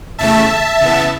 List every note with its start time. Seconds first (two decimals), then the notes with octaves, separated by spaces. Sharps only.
0.19 E2 C#3 A3 E5 A5
0.81 C#3 E3 B3